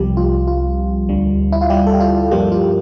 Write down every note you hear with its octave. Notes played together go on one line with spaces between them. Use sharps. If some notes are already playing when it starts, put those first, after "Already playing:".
Already playing: C2 C3 F3 G3 G4
F4
F4
D2 D3 G3
E4
F4
G3 G4
A4
G4
F4
G2 F3 G3 A#3 G4
F4